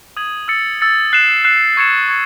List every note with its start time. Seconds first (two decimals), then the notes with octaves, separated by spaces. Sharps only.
0.17 D#6 G#6 D#7 F#7
0.48 E6 A6 C#7
0.81 E6 A6 C#7
1.13 F#6 C7 E7
1.44 F#6 C7 E7
1.77 C#6 G#6 C#7 E7
2.08 C#6 G#6 C#7